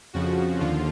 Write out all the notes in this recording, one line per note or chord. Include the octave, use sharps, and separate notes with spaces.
F2 C#3 F3 F#4
D#2 D3 F3 F4